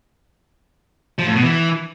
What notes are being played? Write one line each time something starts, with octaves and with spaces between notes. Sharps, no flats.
F3
A2
B2
E3